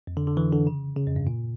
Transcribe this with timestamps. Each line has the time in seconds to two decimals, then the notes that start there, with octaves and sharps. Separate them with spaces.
0.07 F2
0.17 D3
0.27 D3
0.37 E3
0.52 D3
0.67 C#3
0.97 C#3
1.07 F2
1.16 G2
1.27 A#2